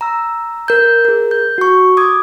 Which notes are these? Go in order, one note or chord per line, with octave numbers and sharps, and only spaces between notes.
A#5 E6
A#4 G6
G#4 A#4
G6
F#4 C#6
D6 D#6 G#6